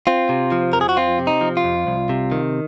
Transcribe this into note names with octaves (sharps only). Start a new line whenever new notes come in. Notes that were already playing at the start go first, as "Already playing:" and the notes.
C4 F4
C3
F3
F2 A#4
G#4
F#4
C4 F4
C3
D#4
F3
F4
F2
C2
C3
D#3